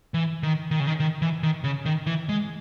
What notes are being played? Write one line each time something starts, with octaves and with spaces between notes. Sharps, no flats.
E3
D#3
D#3
C#3
D#3
D#3
E3
D#3
C#3
D#3
E3
G#3